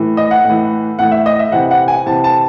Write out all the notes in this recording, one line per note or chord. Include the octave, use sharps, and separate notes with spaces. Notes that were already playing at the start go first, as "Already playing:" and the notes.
Already playing: A2 E3
D#5
F#5
A2
E3
A2 E3 F#5
E5
D#5
E5
C3 E3 F#5
F#5
G#5
C3 E3 A5
A5